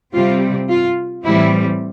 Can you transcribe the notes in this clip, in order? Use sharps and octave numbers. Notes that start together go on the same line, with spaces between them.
C3 G3 C4 F4
F4
A2 E3 G3 C4 E4